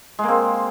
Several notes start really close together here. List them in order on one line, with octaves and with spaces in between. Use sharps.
G#3 A#3 C4